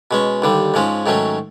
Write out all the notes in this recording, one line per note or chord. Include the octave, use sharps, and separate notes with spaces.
B2 G#3 C#4
D#2 D3 G3
G#2 F3 G#3 C#4
G#2 D#3 F#3 A3 C#4